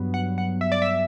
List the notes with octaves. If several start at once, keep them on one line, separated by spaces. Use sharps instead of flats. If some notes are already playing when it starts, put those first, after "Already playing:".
Already playing: G2 F#3 B3
F#5
F#5
E5
D5
E5